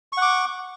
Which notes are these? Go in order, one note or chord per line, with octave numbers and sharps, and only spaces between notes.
F#5 C#6 D6